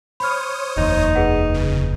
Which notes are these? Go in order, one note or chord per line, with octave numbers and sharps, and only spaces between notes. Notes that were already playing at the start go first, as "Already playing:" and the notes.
C5 C#5 B5 D#6 F6
F1 D#2 D#4
G#4 B4 F#5
C#3